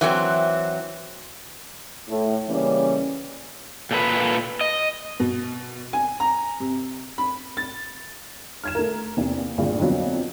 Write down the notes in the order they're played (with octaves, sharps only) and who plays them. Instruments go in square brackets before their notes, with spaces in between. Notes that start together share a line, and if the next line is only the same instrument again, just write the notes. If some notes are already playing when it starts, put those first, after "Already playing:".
[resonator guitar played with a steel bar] E3 F#3 B3 C4
[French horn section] A2
C#3 E3 G3 A#3 C#4
[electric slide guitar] A#2 A4 B4
D#5
[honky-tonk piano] B2
G#5
A#5
C3
B5
A6
F6 G#6 E7
A3 A#4
E2 C3
A#3
G#1 D2 G2 A#2 F4 G#4
F2 D3 F3 F#3 A#3 B3